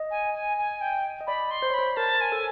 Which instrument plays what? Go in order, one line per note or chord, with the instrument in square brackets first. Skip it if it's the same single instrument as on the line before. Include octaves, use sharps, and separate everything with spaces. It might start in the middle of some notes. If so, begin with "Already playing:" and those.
Already playing: [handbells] D#5
[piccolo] G#5
G#5
G#5
G5
[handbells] D#5
[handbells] D5 [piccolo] B5
[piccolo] C6
[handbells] C5
C#5
[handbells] C5 [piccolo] B5
[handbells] A#4 [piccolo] A5
[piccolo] G#5
[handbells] A4